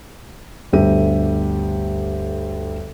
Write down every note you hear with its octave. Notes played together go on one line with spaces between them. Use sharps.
G1 D2 G4 E5 D#7